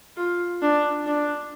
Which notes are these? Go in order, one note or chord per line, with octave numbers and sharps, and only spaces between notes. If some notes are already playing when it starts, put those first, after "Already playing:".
F4
D4
D4